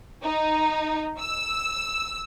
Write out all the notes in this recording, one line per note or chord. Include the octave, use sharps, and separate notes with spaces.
D#4
E6